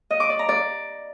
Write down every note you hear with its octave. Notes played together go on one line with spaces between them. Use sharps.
D#5
D6
D5
A#5
D5